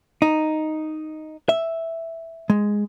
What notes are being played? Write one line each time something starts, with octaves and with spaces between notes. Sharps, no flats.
D#4
E5
G#3